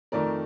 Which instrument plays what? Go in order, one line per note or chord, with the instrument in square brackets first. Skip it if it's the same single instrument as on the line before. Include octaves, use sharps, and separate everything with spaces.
[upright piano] F2 D#3 A3 D#4 A#4 D5